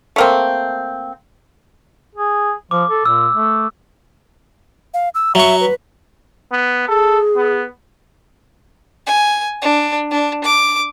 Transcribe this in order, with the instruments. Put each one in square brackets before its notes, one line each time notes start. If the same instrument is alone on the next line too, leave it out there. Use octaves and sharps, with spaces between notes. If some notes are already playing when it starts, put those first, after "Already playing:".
[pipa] A3 A#3 C4
[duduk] G#4
[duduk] F3 [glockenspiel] D6
[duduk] A4
[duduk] A#2 [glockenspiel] E6
[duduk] A3
[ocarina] F5
E6
[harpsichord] F#3 C#6 [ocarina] E5
[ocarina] B4
[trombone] B3
[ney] G#4 [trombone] A4
[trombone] B3
[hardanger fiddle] G#5
D4
D4
D6